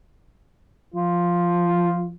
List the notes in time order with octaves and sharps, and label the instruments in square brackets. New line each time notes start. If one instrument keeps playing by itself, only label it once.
[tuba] F3 [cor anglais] F4